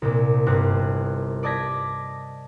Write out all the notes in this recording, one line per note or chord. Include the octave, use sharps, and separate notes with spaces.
C2 A#2
G1 C4 F#6
D5 D#5 A5 G#6 A#6 B6